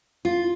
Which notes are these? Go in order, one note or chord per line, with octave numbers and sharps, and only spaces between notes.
F4